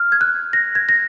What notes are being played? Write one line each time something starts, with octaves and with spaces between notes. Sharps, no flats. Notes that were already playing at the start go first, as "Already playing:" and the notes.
Already playing: F6
G#6
F#6
A#6
G#6
A#6